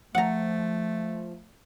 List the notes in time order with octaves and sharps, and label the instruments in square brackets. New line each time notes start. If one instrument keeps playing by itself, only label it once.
[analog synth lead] F3 [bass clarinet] A3 [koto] F#5 A#5